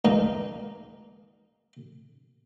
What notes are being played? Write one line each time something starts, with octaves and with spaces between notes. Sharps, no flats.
C#2 A#3 D#4